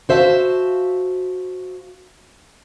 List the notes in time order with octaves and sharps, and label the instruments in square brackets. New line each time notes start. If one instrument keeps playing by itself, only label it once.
[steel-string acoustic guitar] F#4 C5 E5 F5 A5